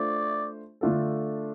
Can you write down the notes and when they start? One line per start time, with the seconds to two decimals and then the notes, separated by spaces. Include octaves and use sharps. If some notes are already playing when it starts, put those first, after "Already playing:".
Already playing: A3 D4 F4 C5 D5
0.81 D3 A3 D4 F4 A4